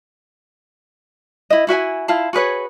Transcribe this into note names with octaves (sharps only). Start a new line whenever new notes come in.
E4 D#5
E4 F#4 E5 G#5
E4 F4 F5 A5
F#4 G#4 B4 C#5